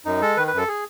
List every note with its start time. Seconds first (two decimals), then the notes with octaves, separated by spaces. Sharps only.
0.05 F#2 D#4
0.21 G#3 A4
0.37 D#3 B4
0.47 F#2 B4
0.58 A4
0.68 G#4